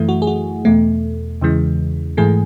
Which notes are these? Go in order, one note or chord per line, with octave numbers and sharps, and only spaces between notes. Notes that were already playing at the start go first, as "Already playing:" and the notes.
Already playing: F#2 E3 A3 E4
F#4
G#4
F#4
E2 B2 A3
E2 C#3 E3 G#3
G#2 E3 A3 G#4